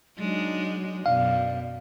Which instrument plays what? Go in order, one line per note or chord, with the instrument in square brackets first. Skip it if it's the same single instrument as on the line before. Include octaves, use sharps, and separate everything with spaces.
[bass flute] F#3 [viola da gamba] G#3 D4 D#4
[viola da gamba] F#2 B2 [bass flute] D5 [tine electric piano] F5